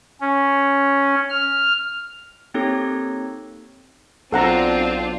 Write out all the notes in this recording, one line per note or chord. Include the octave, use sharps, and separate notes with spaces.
C#4
F6
A#3 C4 D#4 G4 A4 C#5
B1 C4 D4 F4 A4 F#5 A#5